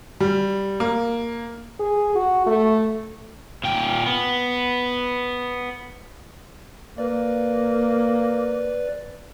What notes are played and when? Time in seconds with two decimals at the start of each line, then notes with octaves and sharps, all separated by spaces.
0.20 G3
0.80 A#3
1.79 G#4
2.15 F#4
2.46 A3
3.64 A#2 G5
4.06 B3
6.98 A#3 B4 D5